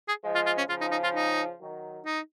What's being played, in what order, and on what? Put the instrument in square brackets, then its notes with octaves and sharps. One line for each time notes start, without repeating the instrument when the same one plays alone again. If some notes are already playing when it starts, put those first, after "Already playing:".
[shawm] G#4
[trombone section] F3 G#3
[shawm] F4
F4
C#4
[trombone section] C#3 F3 [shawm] F4
[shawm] D#4
D#4
F4
D#4
[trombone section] D#3 F#3
[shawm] D#4